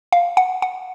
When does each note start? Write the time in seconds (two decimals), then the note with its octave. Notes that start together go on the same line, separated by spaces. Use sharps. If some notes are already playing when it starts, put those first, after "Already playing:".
0.12 F5
0.37 F#5
0.62 F#5